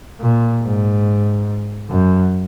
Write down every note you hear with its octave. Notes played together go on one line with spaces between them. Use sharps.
A#2
G#2
F#2